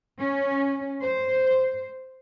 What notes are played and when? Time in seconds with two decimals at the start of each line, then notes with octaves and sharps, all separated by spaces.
0.18 C#4
1.01 C5